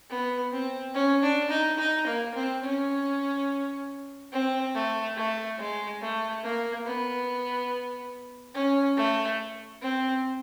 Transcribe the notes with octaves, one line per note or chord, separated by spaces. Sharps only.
B3
C4
C#4
D4
D#4
D#4
A#3
C4
C#4
C4
A3
A3
G#3
A3
A#3
B3
C#4
A3
C4